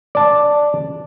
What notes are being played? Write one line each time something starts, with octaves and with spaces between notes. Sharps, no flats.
D5 A5